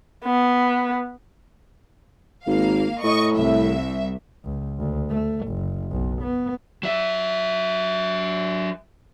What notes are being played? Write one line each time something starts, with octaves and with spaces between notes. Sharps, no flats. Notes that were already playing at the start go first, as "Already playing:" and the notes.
B3
G#1 A#3 F5
A2 D#5 C#6
C2 E5
C#2
D2
A3
F#1
B1
B3
F#3 E5